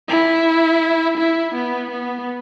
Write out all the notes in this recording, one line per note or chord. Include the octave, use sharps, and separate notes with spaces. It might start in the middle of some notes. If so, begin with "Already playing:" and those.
E4
E4
B3
B3